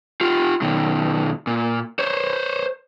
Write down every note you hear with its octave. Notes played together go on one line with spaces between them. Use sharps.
F4 G4
B2 D#3
A#2
C5 C#5